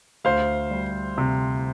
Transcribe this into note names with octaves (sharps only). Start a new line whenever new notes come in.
D2 C5 F5
G3
C3